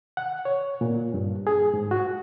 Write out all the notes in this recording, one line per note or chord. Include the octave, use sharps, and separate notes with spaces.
F#5
C#5
A#2
G2
G#4
G#2
F#4